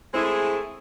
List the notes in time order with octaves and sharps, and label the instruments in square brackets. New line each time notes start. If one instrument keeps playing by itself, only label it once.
[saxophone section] G#3 A3 C4 E4 G#4